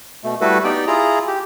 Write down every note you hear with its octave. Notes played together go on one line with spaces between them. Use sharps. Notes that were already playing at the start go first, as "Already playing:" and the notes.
B2 A3
G3 A3 E4 F#4 A4 B4
B3 D#4 G4 D5 G5
E4 F4 G#4 A#5
G4